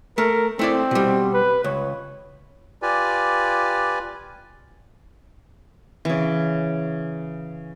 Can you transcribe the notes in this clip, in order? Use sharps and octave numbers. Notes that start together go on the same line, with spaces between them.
A3 A#4
A3 C4 E4 D5
B2 G3
B4
C#2 C#5
F4 G4 B4 D5 G#5
C#3 E3